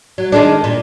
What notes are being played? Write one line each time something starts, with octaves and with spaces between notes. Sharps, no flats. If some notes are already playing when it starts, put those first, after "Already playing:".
F#3
D#3 G#3 D4
A#2